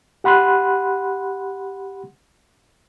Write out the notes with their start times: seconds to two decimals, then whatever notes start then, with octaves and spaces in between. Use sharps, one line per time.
0.24 G4 F#5 B5 C6 F#6